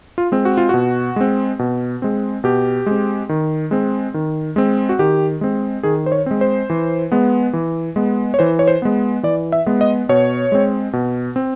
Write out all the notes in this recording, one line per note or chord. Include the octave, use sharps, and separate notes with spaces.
F4
G#3 C4
F#4
F4
B2 F#4
G#3 C4
B2
G#3 C4
B2 G4
G#3 C4
D#3
G#3 C4
D#3
G#3 C4
F#4
D#3 G4
G#3 C4
D#3 G#4
C5
C#5
G#3 C4
C5
E3
G#3 B3
E3
G#3 B3
C#5
E3 C5
C#5
C5
G#3 B3
E3 D5
E5
G#3 B3
D#5
B2 C#5
G#3 C4
B2
C4